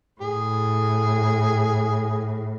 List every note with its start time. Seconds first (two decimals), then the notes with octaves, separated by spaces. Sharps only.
0.21 A2 G#4